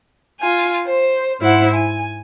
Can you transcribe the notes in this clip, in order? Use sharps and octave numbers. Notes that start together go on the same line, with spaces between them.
F4 G#5
C5
G#2 E4 C5 F#5
G#5